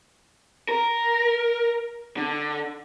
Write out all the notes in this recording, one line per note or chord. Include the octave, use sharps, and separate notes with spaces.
A#4
D3